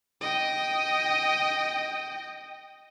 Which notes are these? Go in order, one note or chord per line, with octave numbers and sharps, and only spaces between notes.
D#5 G5